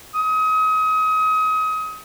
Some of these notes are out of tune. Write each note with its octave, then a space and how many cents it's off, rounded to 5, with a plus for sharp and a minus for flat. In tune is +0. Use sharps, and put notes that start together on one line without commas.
D#6 +30